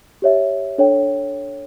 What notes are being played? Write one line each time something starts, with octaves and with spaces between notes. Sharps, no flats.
G4 C#5 E5
D4 A4 C#5 G5